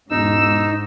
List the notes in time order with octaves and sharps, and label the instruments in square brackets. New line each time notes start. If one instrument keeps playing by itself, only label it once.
[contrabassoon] E1 [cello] G#2 [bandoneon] D#4 [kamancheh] E6